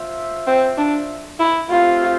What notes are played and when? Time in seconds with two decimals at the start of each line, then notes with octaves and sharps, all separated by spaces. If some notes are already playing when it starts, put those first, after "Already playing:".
Already playing: F4 C5 E5
0.47 C4
0.78 D4
1.40 E4
1.70 A3 C4 F4 G4 C5 F5